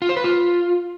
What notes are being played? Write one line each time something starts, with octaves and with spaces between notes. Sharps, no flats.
F4
C5
B4
F4